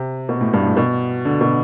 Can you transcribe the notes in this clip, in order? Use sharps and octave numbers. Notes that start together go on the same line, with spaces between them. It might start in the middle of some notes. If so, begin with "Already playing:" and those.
Already playing: C3
B2
A2
G2
A2
B2
D3
B2